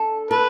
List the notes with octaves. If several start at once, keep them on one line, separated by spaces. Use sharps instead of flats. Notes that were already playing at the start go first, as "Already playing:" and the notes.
Already playing: D4 A4
A4 B4